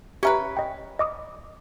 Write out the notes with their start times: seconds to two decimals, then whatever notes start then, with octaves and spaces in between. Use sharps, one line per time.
0.23 C#4 G4 A#4 B4 E5
0.57 D#5 G5
0.99 D#5 D6 D#6